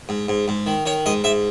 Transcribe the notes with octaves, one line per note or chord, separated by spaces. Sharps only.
G#2
G#2
G#2
D#3
D#3 C#5
G#2 D#5
G#2 E5